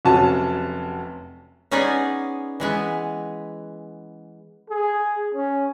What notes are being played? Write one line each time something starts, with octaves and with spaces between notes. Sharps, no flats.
F1 C3 F#3 C#4 F#4 A5
B3 C#4 D#4 G#4 D5 G#5
E3 G#3 B3
G#4
C#4